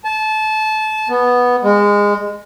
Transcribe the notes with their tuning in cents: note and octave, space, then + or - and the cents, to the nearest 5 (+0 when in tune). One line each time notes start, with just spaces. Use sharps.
A5 -25
B3 -5
G#3 -20